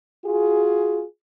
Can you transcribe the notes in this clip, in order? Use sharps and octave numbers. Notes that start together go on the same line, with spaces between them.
F4 F#4 G#4